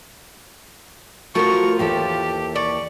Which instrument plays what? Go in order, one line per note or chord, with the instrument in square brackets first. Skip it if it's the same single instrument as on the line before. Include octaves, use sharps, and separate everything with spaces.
[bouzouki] F3 F4 [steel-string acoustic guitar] A3 F#4 A#4 [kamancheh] C#6
[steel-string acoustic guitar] D#2 E3 A4 [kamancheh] G4
[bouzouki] D5 [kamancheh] C#6